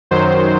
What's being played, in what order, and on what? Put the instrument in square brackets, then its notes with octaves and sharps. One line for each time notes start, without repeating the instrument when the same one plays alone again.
[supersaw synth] F#2 D#3 F#3 C5